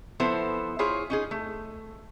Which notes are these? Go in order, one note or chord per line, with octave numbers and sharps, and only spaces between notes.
F3 B3 E4 A4 C5
E4 F4 G#4 C5 C#5
C#4 D#4 G#4
A3